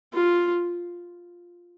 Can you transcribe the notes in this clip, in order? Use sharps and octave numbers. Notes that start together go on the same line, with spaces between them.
F4